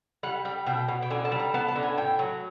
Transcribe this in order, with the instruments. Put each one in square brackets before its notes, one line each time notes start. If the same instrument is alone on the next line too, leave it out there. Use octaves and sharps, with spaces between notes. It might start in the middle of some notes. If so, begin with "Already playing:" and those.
[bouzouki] G3 F#5
G3 G5
B2 G5
B2
G5
D3 G#5
A5
G3
A#5
B3 A5
A5
D3
G#5
A2 G5
F#3